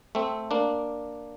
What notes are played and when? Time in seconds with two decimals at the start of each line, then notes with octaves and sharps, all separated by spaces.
0.15 A3 C4
0.51 A#3 D4